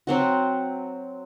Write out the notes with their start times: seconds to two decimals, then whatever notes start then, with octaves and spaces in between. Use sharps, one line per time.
0.07 F#3 C4 F#4